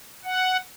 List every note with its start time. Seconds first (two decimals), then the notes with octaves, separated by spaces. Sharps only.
0.25 F#5